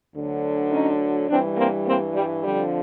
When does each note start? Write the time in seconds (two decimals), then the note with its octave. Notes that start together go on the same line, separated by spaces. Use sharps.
0.13 D2 D3 F#3
0.71 C#4 D#4
1.29 G2 E3 G3 C4 D4
1.58 A#3 C4
1.87 A#3 C4
2.15 G3
2.44 F2 D3 F3 G3